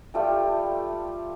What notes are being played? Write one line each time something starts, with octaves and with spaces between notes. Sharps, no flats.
G3 A3 F4 G5